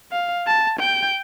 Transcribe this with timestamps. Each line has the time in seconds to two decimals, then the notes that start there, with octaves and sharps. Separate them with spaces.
0.12 F5
0.47 A5
0.80 G5